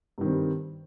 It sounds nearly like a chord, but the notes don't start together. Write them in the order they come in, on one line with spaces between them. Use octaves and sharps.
G2 D#3 C4 G3